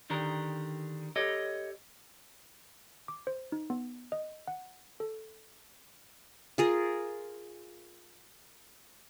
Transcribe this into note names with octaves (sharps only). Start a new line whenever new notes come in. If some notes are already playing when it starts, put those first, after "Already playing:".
D3 D#3 D4 G4 A#4
G4 A4 C#5 D#5
D6
C5
D#4
B3
D#5
F#5
A4
F4 G#4 A#4